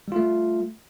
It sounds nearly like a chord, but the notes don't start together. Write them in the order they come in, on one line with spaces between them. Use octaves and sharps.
G3 F4 A3